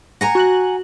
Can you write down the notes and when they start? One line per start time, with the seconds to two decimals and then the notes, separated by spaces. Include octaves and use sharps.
0.21 F#5 G#5 A#5 A#6
0.35 F#4 F#6 F#7